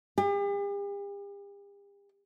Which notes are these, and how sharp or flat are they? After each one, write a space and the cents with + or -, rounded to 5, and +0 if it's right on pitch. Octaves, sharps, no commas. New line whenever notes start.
G4 +45